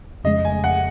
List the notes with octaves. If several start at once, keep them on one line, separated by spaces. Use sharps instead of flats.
F2 C#3 G#3 D#5
G#5
F#5